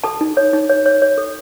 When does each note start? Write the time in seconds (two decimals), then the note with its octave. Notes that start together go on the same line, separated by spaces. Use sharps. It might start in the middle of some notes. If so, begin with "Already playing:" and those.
0.04 A4 A5
0.21 D#4
0.37 C#5
0.53 D#4
0.69 C#5
0.86 C#5
1.02 C#5
1.18 A4